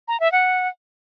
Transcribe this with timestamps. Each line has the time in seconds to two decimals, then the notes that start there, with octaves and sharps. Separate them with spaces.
0.08 A#5
0.20 E5
0.32 F#5